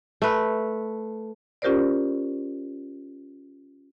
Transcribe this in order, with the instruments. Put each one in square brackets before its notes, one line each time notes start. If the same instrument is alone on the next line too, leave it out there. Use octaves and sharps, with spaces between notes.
[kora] A3 B4
[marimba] C#4 F4 G4 A#4 C5 D5